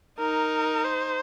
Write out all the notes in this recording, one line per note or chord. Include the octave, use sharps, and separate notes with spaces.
D#4 A#4
C5